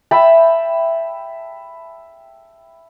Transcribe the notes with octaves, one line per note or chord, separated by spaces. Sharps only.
E5 G5 A5 B5